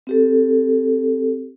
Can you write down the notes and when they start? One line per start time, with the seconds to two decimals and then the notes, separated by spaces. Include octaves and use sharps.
0.07 C4 G4 A4